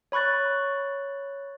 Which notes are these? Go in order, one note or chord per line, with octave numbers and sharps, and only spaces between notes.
C#5 B5 C#6 F#6 A6